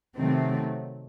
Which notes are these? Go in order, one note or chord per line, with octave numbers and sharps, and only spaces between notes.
C3 D#3 F#3 A3 C4